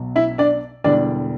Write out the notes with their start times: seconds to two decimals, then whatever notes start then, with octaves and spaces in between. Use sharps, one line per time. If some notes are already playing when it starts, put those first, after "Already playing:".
Already playing: B1 B2 F#3
0.16 E4 E5
0.38 D4 D5
0.84 E1 E2 D3 G3 D4 D5